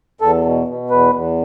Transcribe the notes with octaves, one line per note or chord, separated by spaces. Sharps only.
E2 A4
B2
B2
E2 B4
E2